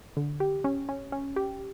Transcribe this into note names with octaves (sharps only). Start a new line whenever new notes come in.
D3
G4
C#4
C#4
C#4
G4